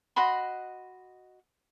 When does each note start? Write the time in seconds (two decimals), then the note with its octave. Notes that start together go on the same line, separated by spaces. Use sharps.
0.16 F#4 D#5 B5 C6